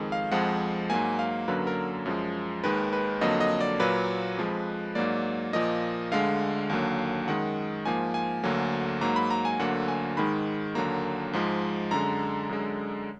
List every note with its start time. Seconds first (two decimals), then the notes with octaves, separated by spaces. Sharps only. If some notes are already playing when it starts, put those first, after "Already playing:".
Already playing: F2 D#3 G#3
0.12 F5
0.31 F2 F3 G#3 F#5
0.90 G#2 F#3 A#3 G#5
1.19 F5
1.48 F#2 D3 F#3 A#3 B4
1.67 A#4
2.06 F#2 F3 G#3
2.64 D#2 D#3 G#3 B4
2.93 B4
3.21 F2 D3 F#3 A#3 D#5
3.40 D#5
3.60 D5
3.80 A#2 F#3 A#3 B4
4.37 F2 F3 G#3
4.95 G#2 F#3 A#3 D5
5.53 A#2 F3 A#3 D#5
6.11 D2 D3 G#3 F5
6.70 D#2 D3 F#3 A#3
7.27 F#2 D#3 G#3 F#5
7.85 G#2 F3 A#3 G#5
8.14 G#5
8.43 D2 D3 F#3 A#3
9.01 G#2 F#3 A#3 A#5
9.16 B5
9.30 A#5
9.45 G#5
9.59 D2 D3 F#3 A#3 F#5
9.88 G#5
10.17 G#2 D#3 G#3 B5
10.75 D#2 D3 F#3 A#3 A#5
11.33 G#2 F3 G#3
11.91 F#2 D3 G#3 A#5
12.49 F#2 D3 G#3